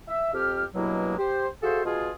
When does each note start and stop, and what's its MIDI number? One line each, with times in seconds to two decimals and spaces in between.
0.08 0.31 76
0.33 0.64 41
0.33 0.64 67
0.33 0.64 89
0.75 1.14 43
0.75 1.14 47
0.75 1.14 54
0.75 1.14 56
0.75 1.14 58
0.75 1.14 64
1.19 1.47 67
1.19 1.47 72
1.63 1.83 66
1.63 1.83 68
1.63 1.83 69
1.63 1.83 72
1.63 1.83 76
1.63 1.83 77
1.85 2.11 47
1.85 2.11 65
1.85 2.11 68